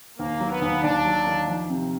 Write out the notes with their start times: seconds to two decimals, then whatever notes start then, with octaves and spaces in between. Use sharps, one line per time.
0.19 D#2 A#3
0.40 F#3
0.51 B3
0.62 D#2
0.83 D#2 D4
1.05 F#3
1.27 D#3
1.48 F3
1.70 C3